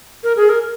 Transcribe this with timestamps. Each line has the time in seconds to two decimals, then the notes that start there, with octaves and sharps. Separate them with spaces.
0.24 A#4
0.37 G#4
0.49 A#4